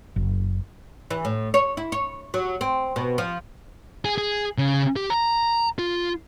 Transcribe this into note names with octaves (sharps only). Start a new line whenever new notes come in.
F#1
E3
A2
C#5
E4
C#5
F#3
C4
B2
F3
G#4
G#4
C#3
G4
A#5
F4